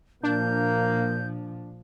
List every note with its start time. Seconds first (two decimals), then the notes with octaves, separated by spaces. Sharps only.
0.23 A#2 F3 A#3 D4 G6